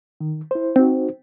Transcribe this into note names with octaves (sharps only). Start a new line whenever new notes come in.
D#3
E4 C5
C4 D#4 F#4